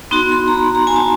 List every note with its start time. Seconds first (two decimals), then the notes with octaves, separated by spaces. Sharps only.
0.11 B3 D#4 F#4 C6
0.32 C6
0.48 A#5
0.54 B5
0.75 A#5
0.87 G#5
0.96 A5